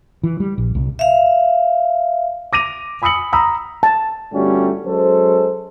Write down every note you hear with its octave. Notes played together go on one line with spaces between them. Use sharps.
E3
G3
A#1
C2
E5 F5
D6 A#6 D#7 F7
G#5 B5 D#6 E6 C#7 F#7
A#5 B5 D#6 E6
A5
G1 G3 A3 C#4 F#4 G4
F#3 G#3 C#4 A4 C5